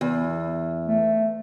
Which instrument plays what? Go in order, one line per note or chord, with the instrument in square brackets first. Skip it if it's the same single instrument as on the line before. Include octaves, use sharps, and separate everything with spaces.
[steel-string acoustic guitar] E2
[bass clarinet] A3